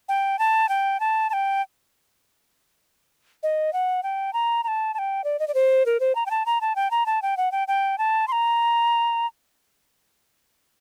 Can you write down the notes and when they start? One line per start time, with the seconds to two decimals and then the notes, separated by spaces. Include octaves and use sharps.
0.09 G5
0.39 A5
0.69 G5
1.00 A5
1.30 A5
1.33 G5
3.43 D#5
3.73 F#5
4.03 G5
4.33 A#5
4.64 A#5
4.68 A5
4.94 A5
4.99 G5
5.24 D5
5.39 D#5
5.48 D5
5.54 C5
5.86 A#4
6.00 C5
6.15 A#5
6.26 G5
6.31 A5
6.46 A#5
6.61 A5
6.76 G5
6.91 A#5
7.06 A5
7.22 G5
7.37 F#5
7.52 G5
7.68 G5
7.98 A5
8.28 C6
8.32 A#5